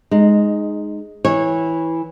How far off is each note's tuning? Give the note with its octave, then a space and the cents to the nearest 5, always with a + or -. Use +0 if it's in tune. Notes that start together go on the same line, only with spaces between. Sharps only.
G#3 +0 D#4 -15
E3 -10 C#5 -20